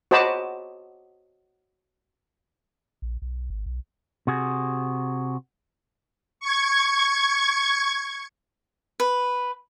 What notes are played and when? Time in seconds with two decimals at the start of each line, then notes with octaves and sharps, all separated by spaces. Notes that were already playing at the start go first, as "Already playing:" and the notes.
0.11 F#4 C5 D#5 A5 B5 D6
3.02 A#1
3.22 B1
3.50 G#1
3.66 B1
4.27 C3 F#4 G#4
6.40 C#6 G#6
9.00 B4